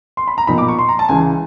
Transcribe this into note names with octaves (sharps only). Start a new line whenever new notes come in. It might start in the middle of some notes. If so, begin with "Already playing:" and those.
C6
B5
A#5
B1 A#2 F3 A#3 D#4 B5
D6
C#6
C6
A#5
A5
C#2 C#3 E3 G#5